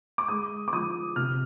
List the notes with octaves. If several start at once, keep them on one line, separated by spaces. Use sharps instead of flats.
D6
G#3 D#6
D6
F3 D#6
C3 F6